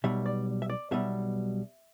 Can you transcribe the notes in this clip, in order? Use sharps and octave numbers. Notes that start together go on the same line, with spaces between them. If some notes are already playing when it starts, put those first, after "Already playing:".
B1 B2 G3 E5
D5
E5
D5
B1 B2 G3 E5